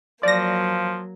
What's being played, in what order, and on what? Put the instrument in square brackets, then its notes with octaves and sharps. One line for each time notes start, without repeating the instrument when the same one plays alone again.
[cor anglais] F3 [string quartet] F#3 A#3 [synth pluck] D5 A#6